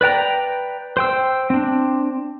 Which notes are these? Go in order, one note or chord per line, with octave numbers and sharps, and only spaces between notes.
B4 D5 G5 A#5
C5 G5 E6
C4 D4